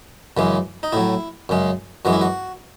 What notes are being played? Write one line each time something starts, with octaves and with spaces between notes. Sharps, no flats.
F#2 C#3 E3 G#3
D#4
A2 F#3 E4
F#2 C#3 G#3
F#2 E3 G#3 F#4
E4
F#4